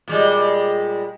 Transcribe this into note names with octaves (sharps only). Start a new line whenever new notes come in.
A#2 G3 G#3